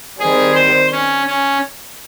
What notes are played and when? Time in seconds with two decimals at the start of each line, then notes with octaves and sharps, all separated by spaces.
0.20 D#3 G3 C4 G#4
0.55 C5
0.92 C#4
1.27 C#4